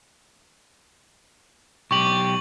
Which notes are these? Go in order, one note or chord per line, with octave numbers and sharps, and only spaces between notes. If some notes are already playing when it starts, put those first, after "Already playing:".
B1 G4 C#6 F#7